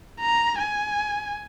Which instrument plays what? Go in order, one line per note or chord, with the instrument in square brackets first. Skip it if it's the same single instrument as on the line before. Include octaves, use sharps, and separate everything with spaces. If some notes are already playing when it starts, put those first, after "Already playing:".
[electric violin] A#5
G#5